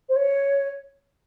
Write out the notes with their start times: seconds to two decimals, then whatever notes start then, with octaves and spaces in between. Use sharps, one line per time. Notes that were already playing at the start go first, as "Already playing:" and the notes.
0.09 C5
0.16 C#5